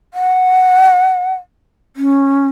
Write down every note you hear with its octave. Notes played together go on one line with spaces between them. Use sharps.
F#5
C#4